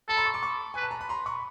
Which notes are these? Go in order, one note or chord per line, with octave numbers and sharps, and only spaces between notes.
A4 A5 B5
A#5 C6
B5 C#6
C6 D6
B5 C#6
B4 G#5
A5
A#5
B5
A#5 C6
B5 C#6